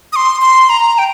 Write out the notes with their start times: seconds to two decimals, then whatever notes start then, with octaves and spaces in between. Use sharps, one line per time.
0.13 D#6
0.16 C6
0.42 C6
0.69 A#5
0.98 G5